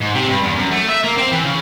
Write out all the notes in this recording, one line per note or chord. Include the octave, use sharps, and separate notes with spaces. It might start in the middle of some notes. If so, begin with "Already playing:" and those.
G#2
C3
G2
E2
F#2
A3
E5
A#3
C4
E3
C#3